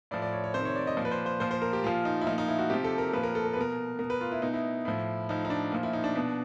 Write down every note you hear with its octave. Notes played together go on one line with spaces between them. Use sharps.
A2 F3 D5
D5
C#5
C#5
C3 D#3 C5
C#5
D5
D#5
A#2 F3 D5
B4
C5
C5
A#2 F3 C5
C5
A#4
G4
A#2 F3 F4
D#4
E4
A#2 F3 D#4
D#4
E4
F#4
C3 F3 G4
A4
A#4
A#2 F3 B4
A#4
A4
A#4
B4
B2 A#4
B2 A#4
B4
F4
E4
B2 D#4
E4
A2 F3
A2 F3 D#4
D#4
D4
A#2 F3
E4
D#4
D4
B2